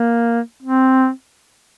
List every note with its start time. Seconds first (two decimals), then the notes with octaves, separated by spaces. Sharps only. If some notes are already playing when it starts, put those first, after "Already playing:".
Already playing: A#3
0.63 C4